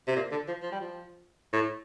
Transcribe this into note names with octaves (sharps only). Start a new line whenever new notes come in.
C3
A#2
D3
F3
F3
G3
F3
A2